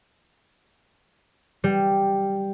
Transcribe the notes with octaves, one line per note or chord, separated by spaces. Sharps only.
G3